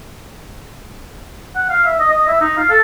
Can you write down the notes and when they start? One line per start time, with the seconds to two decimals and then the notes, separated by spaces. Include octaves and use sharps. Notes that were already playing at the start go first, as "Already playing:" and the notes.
1.56 F#5
1.69 F5
1.86 E5
1.99 D#5
2.11 D#5
2.27 E5
2.41 D#4
2.57 F5
2.70 A4